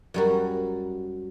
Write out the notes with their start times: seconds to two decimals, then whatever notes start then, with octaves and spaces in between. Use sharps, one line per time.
0.14 F#2 G3 F#4